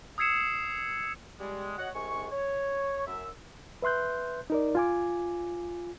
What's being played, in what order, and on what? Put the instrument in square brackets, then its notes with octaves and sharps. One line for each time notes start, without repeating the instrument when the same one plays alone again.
[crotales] D#6 E6 G#6 C7 C#7 E7
[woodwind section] G3 G#3
F#4 C#5 D#5 F#5
C2 G#3 G#5 C#6
C#5
F#2 E5
[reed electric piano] B4 E5 C6 F#6 G6
D#4 A#4 D5
F4 G#5 D6